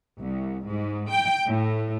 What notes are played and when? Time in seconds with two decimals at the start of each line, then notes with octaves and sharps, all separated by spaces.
0.20 C2
0.65 G#2
1.09 G5
1.46 A2